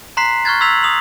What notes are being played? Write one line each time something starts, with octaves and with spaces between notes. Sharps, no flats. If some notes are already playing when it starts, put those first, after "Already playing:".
A#5 C6 F#6 B6 C7
C#6 F6 F#6 G#6 A6
C6 E6 G#6 B6 F7 F#7
D#6 F7 F#7